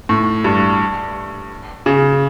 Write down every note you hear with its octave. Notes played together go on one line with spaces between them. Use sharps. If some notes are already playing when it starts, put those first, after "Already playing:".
A2
G2
C#3